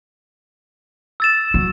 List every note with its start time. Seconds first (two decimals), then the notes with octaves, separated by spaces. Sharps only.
1.20 E6 A6 E7
1.54 F#3